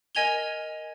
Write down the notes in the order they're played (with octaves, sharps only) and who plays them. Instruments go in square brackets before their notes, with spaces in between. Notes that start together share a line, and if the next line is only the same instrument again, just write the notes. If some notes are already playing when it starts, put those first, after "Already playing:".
[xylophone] A#4 D#5 G#5 G#6 F7 G7